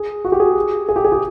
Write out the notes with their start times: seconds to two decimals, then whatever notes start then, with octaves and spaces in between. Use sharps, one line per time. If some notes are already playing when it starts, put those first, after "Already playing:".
Already playing: G#4
0.25 F#4
0.32 G4
0.40 G#4
0.89 G#4
0.96 G4
1.05 G#4
1.12 G4